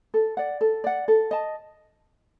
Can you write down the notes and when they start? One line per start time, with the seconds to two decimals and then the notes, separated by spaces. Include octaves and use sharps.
0.14 A4
0.37 D5 F#5
0.61 A4
0.84 D5 F#5
1.08 A4
1.31 D#5 A5